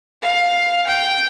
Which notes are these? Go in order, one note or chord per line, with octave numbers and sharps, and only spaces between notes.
F5
G5